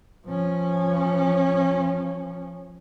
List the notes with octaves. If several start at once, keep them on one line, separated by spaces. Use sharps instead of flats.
F3 C#4